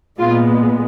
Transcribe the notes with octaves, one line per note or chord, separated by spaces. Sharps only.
A#2 G#3 B3 F4